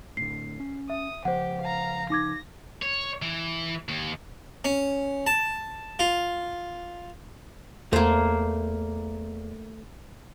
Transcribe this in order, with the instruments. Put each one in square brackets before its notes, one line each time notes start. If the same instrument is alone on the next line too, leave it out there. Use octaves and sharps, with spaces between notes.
[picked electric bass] A2 D3 [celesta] C7
[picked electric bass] C#4
[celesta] E5 [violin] D#6
[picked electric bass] C#3 F3 [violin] G4 [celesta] C5 F#5
[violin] F5 A#5
[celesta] D#4 D6 G#6 [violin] A#6
[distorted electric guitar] C#5
E3
D#2
[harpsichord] C#4
A5
F4
[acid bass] E2 [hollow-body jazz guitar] A3 [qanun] A#3 C5